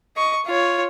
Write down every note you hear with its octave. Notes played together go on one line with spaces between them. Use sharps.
D#5 C#6
F4 C#5